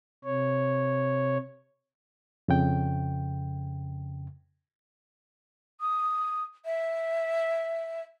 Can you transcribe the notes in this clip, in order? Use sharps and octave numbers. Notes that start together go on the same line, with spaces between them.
C3 C#5
F2 C#3 G5
D#6
E5